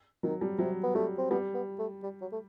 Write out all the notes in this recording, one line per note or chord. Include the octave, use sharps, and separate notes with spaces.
D#3 F#3
G3
C3 F#3
B3
G3 A3
C4
G3 B3
B3
A3
G3
F#3
A3